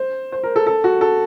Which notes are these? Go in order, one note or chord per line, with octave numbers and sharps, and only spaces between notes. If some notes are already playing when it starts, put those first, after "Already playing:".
Already playing: C5
C5
A#4
A4
A4
F#4
A4